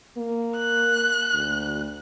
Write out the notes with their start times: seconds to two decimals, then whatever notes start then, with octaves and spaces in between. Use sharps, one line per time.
0.18 A#3
0.59 F#6
1.34 D2